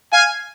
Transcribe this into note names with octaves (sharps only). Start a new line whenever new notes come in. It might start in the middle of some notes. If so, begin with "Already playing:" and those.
F5 G#5